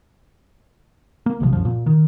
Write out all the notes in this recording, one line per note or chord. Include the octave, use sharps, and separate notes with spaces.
A#3
A#1 C3 D#3 F3
C2 F#2 F3
A#2
D#3